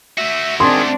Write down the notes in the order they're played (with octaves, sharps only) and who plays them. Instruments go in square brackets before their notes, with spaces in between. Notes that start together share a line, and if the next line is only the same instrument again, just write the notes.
[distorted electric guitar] A3 F#4 [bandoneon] E5
[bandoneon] D#3 G#4 [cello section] C4 D4 [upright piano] C6